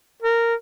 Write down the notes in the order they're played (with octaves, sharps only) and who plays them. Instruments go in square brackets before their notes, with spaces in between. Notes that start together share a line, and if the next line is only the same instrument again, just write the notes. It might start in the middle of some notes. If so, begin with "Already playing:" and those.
[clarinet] A#4